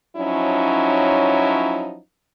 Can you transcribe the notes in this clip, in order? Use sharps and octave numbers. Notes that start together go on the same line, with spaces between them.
F3 F#3 C#4 D#4 E4